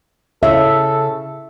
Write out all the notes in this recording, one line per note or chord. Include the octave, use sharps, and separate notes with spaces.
C#3 A4 E5